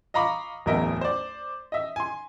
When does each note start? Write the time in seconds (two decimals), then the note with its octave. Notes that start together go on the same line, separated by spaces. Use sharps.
0.14 D#5 F5 A#5 B5 C#6 D6
0.66 D1 A1 E2 A#4 D#5 E5
1.01 C5 D5
1.72 D#5 E5
1.96 G#5 C6